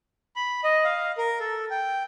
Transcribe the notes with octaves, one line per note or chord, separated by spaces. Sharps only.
B5
D#5
F5
A#4
A4
G5